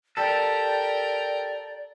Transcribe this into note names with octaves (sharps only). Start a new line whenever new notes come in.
G4 A4 A#4 D5 G5